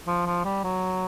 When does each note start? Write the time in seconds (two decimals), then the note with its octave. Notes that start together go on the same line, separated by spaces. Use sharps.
0.07 F3
0.26 F3
0.45 G3
0.64 F#3